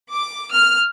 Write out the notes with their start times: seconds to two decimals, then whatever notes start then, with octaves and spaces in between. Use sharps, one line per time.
0.13 D6
0.52 F6